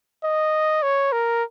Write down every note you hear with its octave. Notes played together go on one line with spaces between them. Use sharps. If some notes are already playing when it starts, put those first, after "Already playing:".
D#5
C#5
A#4